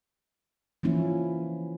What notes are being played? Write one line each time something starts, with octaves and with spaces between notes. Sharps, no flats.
E3 F3 A#3 C#4 E4